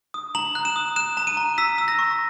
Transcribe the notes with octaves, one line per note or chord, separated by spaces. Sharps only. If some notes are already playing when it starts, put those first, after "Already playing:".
D#6
A#5 F#7
F#6
E7
D#6
F#6 E7
A#5
D#7
A#5
E6 B6
E6
A#6
C#6